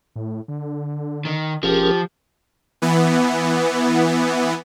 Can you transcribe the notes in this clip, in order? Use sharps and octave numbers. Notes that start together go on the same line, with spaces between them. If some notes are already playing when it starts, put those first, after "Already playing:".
A2
D3
D#3
E1 F3 C#4 G4 G#4 A#4
E3 B3